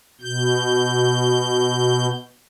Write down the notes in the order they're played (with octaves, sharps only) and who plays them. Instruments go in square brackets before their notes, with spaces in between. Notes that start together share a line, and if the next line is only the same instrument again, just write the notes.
[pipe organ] B2 G6